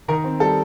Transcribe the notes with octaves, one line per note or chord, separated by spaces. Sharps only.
D#3 A#4
C4
G3 A4